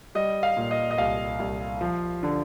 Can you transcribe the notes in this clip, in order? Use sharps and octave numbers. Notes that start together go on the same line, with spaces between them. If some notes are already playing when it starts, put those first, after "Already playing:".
G3 D#5
F5
A#2
D#5
D#5
C2 F5
C2
F3
D3